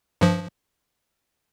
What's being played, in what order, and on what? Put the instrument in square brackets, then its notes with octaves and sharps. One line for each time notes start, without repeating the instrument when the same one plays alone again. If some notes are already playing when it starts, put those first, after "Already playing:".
[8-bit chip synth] G2 F3